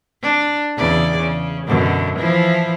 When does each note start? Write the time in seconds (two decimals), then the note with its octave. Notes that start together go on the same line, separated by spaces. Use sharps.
0.22 D4
0.77 E2 C#3 D5
1.17 C#3
1.67 F#2 B2 D3
2.17 E3 F3 E4